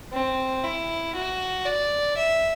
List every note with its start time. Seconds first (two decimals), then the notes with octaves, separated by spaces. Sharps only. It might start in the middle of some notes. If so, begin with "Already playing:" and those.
0.13 C4
0.64 E4
1.15 F#4
1.66 D5
2.17 E5